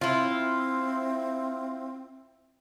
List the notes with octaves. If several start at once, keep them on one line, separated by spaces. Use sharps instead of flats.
C4 E4 F4